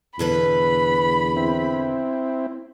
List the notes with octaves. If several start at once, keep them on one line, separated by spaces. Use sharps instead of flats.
E2 B2 D3 B4 B5
C4 E4